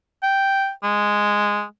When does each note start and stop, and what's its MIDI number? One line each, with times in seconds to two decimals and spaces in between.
0.23 0.70 79
0.84 1.64 56